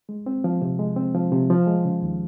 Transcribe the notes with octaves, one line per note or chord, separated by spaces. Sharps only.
G#3
C4
F3
C3
G#3
C4
F3
C3
F3
G#3
C#3
D#2